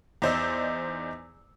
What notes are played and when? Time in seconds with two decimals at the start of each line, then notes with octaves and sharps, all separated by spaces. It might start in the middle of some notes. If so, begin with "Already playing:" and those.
0.22 E2 D#4 C5 D5 E6